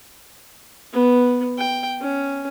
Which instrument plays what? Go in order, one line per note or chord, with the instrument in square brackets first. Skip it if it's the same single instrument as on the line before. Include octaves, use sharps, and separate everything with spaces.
[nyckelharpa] B3
G5
C#4